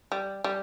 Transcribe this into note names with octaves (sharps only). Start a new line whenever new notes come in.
G3
G3